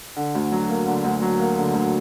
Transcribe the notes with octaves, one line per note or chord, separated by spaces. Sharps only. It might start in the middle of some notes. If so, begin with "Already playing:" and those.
D3
D2
F#3
A#3
D3
D2
F#3
A#3
D3
D2